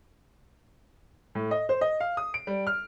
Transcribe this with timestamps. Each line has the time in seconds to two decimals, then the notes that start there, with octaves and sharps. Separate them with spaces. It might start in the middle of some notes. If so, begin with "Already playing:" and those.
1.35 A2
1.51 D#5
1.69 C5
1.81 D#5
2.00 F5
2.17 D#6
2.34 D7
2.47 G3
2.67 F6